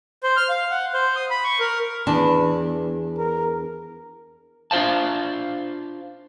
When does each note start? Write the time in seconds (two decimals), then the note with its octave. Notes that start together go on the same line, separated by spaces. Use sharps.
0.23 C5
0.37 F6
0.49 F5
0.71 F#5
0.93 C5
1.16 D#6
1.30 B5
1.44 C#6
1.60 A#4
2.07 E2 D4
3.18 A#4
4.71 D4 F4 C5 F5 A5